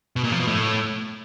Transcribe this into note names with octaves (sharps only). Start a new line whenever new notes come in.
B2
A#2
F3
B2
A2